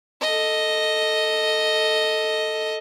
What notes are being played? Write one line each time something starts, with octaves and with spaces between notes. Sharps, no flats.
A4 D#5